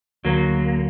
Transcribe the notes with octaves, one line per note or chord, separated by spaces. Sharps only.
D2 F#3 A#3